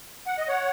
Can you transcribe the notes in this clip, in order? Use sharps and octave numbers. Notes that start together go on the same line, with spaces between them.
F#5
D#5
C#5 F#5